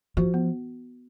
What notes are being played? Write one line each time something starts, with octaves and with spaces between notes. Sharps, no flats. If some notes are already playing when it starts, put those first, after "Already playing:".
F3 F#4
B3